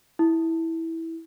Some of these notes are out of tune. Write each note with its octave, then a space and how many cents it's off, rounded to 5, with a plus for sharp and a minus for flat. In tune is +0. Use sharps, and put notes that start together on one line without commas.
E4 -10